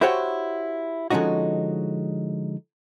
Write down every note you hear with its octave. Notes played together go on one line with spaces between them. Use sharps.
E4 F#4 G4 C5 C#5 F#5
D3 F3 G#3 C#4 D#4 F#4